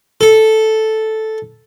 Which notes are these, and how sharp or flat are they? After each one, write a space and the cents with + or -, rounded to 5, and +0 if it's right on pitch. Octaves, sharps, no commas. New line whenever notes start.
A4 -5